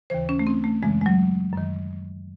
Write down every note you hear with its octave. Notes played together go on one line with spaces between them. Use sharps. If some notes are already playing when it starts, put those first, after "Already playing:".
D#2 C#3 E3 C5
C#4
A3
C4
A3
F#2 C#3 E3 G#3
G#3
F#3
F#2 D#3